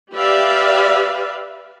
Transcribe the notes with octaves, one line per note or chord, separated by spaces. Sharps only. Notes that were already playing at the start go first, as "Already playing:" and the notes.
G4 B4 D5 E5 F5